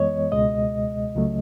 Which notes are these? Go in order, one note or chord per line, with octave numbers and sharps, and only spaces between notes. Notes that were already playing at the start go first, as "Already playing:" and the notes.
Already playing: F#2 E3 G#3 B3 C#5 D#5
C#2 B2 G#3 D#5
C#2 C#3 F#3 A3